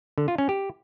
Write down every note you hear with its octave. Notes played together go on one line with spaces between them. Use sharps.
D3
F4
C#4
G4